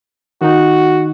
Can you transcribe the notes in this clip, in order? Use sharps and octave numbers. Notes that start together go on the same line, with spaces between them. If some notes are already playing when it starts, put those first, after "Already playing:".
D#3 D#4 F#4